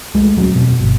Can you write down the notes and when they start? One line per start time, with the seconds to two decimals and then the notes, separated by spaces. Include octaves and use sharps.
0.14 C#2 G#3 A3
0.36 D#1 F#3 B3 C#4
0.55 F1 F#2 B2 C4
0.78 G1